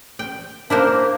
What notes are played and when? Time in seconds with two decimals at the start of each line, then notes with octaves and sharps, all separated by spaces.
0.19 G5
0.70 A#3 D4 E4 A#4 C5